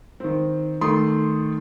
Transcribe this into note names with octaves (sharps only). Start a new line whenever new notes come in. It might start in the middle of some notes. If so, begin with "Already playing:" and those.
D#3 C4
D#3 A3 C6 D#6